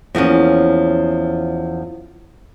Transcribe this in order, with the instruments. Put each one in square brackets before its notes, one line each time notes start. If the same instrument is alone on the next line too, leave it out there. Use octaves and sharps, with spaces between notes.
[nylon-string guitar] E2 F3 A#3 C#4